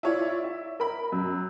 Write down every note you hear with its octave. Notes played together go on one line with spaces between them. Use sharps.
E4 F4 C#5 D5
E5
A#4 B5
F#2